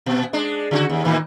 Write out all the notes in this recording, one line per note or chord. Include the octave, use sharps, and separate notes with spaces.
A#2
G#3 D4
C#3 F4 F#4
D#2
A2 D#3 E3